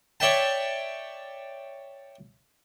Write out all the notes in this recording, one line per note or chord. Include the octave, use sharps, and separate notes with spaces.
C#5 D5 E5 G5 A5